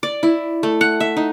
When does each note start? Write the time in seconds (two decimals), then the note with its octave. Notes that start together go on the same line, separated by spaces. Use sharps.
0.03 D5
0.23 E4
0.63 A3
0.81 F#5
1.00 E5
1.17 D#4